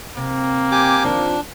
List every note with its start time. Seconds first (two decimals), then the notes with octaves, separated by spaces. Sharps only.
0.17 C3 A#3
0.72 G4 G#5 D6
1.04 D#3 F3 D4